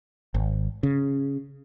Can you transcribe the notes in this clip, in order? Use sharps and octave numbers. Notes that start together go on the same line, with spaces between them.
G#1
C#3